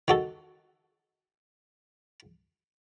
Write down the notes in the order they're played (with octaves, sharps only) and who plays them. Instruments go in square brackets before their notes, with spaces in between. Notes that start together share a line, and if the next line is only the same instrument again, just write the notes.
[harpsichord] D#3 F#4 A4